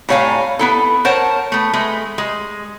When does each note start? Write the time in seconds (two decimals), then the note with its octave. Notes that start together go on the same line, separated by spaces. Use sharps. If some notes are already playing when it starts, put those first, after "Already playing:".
0.09 A2 G3 C#5 F5 G#5 A#5
0.59 B3 E4 A4
1.05 A#4 C5 C#5 F#5 A5
1.52 A3 B3
1.73 G#3 A3
2.18 G#3